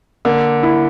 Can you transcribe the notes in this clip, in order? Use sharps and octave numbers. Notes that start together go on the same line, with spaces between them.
D3 A#3
E4